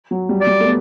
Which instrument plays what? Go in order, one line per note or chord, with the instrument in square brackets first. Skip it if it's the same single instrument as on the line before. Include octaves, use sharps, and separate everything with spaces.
[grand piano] F#3
G3
[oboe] D5
[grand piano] G3
A3
B3